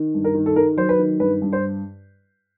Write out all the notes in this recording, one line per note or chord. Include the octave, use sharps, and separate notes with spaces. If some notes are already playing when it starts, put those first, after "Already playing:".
Already playing: D#3
G2
A#4
D#3
A4
D#3 A#4
F#3 C5
B4
D#3
G2 B4
G2
C5